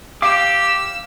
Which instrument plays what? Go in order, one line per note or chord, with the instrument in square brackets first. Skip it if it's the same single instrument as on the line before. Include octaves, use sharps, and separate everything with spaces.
[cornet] G4 [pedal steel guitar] F5 D6 [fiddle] E6